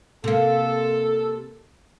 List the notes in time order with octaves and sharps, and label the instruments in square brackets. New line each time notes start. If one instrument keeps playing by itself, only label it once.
[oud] C3 A#3 [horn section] A4